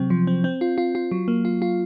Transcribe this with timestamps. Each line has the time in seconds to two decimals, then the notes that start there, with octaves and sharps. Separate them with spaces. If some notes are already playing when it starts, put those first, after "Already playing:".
Already playing: C3 F#3 C4
0.10 F3
0.27 C4
0.44 C4
0.61 F4
0.78 F4
0.95 F4
1.11 F#3
1.28 A#3
1.45 F4
1.62 F4